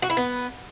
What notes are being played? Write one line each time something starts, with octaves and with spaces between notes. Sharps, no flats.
F#4
E4
B3